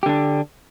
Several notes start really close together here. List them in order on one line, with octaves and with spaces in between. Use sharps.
G4 D3 D4